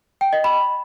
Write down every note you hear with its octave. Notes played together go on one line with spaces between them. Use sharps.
G5
D#5
B5